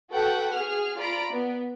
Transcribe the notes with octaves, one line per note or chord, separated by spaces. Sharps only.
F#4 A4 B4 F#5 G5
G#4 F6
F4 D5 A#5 B5 D7
B3